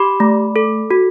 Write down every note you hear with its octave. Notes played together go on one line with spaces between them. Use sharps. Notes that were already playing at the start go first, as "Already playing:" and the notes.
Already playing: G4 B5 D6
A3
A4
F#4